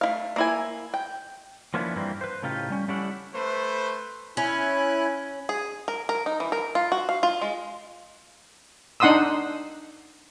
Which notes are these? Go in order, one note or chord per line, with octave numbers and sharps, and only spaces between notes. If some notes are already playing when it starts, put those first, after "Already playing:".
A3 E4 F5
A#3 E4 G#5
G5
F3 A#3 B3 C#4 D4 E4
G2 E3 G3 A#3 C4
B4 C5
A2 C#3 D#4 F4 G4
G3 C#4
G3 A3 C#4 E4 G4 F#5
A3 B4 C5
C#4 E4 G#5 F#6
G#4
A#4
A#4
D#4
E3
A#4
F4
F#4
F5
F4
G#3
D4 D#4 F#5 C6 D#6 E6